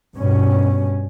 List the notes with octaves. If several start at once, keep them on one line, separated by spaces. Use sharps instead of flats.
G2 B2 C#4